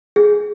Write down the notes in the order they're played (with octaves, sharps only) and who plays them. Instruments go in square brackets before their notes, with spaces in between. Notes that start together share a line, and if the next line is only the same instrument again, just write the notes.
[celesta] G#4